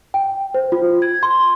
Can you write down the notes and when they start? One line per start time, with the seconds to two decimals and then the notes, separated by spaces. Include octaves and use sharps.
0.14 G5
0.54 C5
0.72 F4
1.02 G#6
1.23 C6